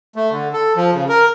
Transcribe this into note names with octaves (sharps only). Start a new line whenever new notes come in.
A3
D3
A4
F3
C#3
A#4